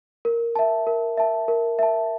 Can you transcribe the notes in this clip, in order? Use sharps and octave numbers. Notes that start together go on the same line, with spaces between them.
A#4
E5 A5
A#4
E5 A5
A#4
E5 A5